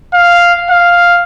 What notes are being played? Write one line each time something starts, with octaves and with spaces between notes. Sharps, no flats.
F5
F5